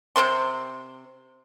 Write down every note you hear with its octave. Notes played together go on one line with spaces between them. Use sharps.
C3 C#4 C5 C6